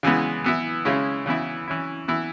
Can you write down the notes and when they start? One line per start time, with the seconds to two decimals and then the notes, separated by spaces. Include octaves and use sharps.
0.03 C#3 E3 G#3 B3
0.44 E3 B3 E4
0.85 C#3 G#3 C#4 E4
1.26 C#3 E3 B3 E4
1.68 E3 C#4 E4
2.08 E3 B3 E4